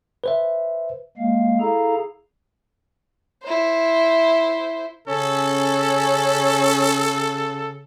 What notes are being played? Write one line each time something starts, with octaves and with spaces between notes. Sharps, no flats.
B4 C5 E5
G#3 A#3 F5
E4 G#4 A4 F5 A#5
E4 C5
C#3 C#4 A4